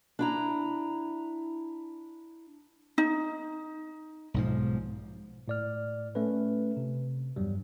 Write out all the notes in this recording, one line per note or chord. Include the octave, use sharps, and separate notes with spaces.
D4 E4 A#5
D#4
B1 G#2 F3
A2 D5 F6
A3 C#4 B4
C3
E2 G2 F#3 G3